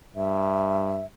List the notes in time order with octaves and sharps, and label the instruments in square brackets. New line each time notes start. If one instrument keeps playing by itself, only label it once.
[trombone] G2 [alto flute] E5